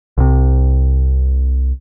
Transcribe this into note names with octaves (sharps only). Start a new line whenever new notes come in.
C2 C3